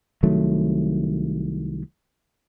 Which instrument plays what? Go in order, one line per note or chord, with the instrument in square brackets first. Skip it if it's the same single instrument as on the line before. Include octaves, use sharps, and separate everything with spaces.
[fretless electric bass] C2 D#3 F#3 A3